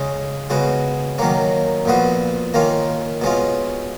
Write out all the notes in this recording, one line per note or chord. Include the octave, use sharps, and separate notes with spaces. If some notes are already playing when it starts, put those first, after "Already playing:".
Already playing: C#3 G#3 C#4
C#3 G#3 B3 F#4
D#3 F#3 A#3 C#4
A#2 F3 B3 F#4
D#3 A#3 C#4 F4
B2 G#3 C#4 F4